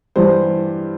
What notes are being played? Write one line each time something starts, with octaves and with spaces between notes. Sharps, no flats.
G2 E3 G3 C5